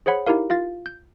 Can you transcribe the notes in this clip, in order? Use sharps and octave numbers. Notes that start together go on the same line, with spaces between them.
G#4 C5 C#5 F#5 B5
D#4 E4 G4 A#4 F5
F4 F5 A6
G6